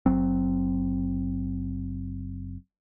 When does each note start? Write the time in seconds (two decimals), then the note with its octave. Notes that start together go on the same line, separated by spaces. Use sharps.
0.06 F#1 F#3 C4